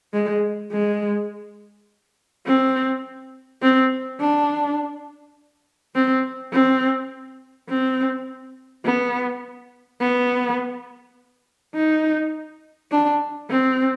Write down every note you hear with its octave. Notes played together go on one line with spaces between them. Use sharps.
G#3
G#3
C4
C4
D4
C4
C4
C4
B3
B3
D#4
D4
C4